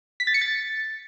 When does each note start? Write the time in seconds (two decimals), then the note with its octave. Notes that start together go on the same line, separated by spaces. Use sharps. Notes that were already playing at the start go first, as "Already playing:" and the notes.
0.20 B6
0.27 A6
0.34 C#7
0.41 A6